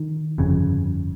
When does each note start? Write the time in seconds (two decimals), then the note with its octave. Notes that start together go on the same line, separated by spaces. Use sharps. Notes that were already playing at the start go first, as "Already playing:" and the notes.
Already playing: D#3
0.38 G1 F2 C#3